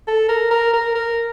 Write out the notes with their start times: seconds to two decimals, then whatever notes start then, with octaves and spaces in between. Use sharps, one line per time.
0.08 A4
0.29 A#4
0.51 A#4
0.74 A#4
0.95 A#4